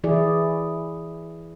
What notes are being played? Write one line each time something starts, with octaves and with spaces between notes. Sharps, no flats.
E3 E4 G#4 D5